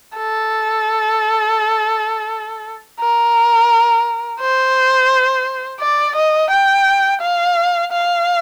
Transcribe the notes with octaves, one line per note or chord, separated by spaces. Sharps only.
A4
A#4
C5
D5
D#5
G5
F5
F5